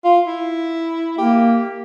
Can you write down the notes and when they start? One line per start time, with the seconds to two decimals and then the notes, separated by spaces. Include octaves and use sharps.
0.04 F4
0.27 E4
1.19 A#3 G4